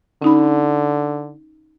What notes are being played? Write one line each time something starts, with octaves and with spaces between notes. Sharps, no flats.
D3 C#4 D#4 B5